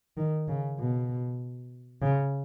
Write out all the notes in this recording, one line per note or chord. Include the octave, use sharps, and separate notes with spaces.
D#3
C#3
B2
C#3